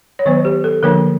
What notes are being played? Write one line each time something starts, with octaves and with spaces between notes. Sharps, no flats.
C#5
D#3 F#3 B3 C5
G4
A4
D3 F3 A#3 D4 A#4